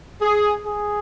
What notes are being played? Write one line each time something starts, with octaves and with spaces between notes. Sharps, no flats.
G#4
G#4